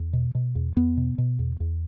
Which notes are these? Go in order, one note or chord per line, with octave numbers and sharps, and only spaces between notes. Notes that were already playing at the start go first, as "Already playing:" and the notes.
Already playing: E2
B2
B2
E2
E2 B3
B2
B2
E2
E2